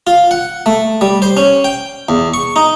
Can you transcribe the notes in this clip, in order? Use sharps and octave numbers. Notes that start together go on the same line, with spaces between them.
F4
F#5
A3
G3
C5
C#4
G5
E2
C#6
D#4